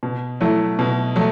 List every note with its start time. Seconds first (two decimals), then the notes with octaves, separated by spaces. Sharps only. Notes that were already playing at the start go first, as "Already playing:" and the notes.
0.03 B2
0.40 F#3 A3 E4
0.79 B2
1.16 F#3 A3